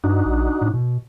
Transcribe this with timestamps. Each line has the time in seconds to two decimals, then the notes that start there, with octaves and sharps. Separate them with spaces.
0.04 G2 D4 D#4 F#4
0.26 A#1
0.61 A2
0.74 B2